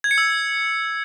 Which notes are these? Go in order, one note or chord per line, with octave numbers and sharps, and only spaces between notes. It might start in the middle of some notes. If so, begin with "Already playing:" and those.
G#6
C#7
E6